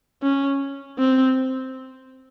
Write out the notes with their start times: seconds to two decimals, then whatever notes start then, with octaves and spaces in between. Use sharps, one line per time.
0.23 C#4
0.99 C4